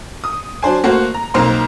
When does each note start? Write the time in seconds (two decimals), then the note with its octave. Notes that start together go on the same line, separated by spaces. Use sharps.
0.24 D#6
0.62 F#3 D4 C5 G#5
0.84 A3 A#3 F#4 C5
1.14 A#5
1.34 B1 A#3 C4 D#4 A#4 C6